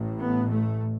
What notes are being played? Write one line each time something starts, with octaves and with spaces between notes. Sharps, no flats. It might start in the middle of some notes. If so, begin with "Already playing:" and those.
Already playing: A1 A2
B3
A3